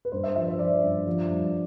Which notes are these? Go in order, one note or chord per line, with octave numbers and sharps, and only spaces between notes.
B4
G2 C5
E5
F3 E5
C5
F3 D5
G2
F3
G2